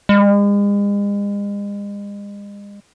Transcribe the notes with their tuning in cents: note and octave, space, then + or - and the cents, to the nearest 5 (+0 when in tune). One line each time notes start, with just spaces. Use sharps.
G#3 -40